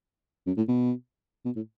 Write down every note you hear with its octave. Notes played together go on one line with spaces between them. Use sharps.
F#2
A2
B2
B2
A2